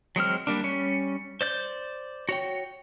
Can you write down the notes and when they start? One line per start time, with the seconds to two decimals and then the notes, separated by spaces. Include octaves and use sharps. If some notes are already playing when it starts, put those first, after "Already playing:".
0.16 F#3 G#3 C4 F6
0.47 G3 A#3 D4
0.64 G3 C#4
1.41 C5 D5 G6
2.29 F#4 C#5 G5